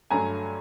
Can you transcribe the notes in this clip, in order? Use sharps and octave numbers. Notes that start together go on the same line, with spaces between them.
G2 D3 F#3 A3 G#5 A#5